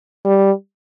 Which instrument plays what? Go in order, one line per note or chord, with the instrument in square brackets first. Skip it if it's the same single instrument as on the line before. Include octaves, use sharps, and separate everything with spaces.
[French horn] G3